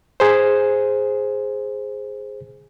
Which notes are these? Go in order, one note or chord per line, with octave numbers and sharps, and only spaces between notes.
G#4 C5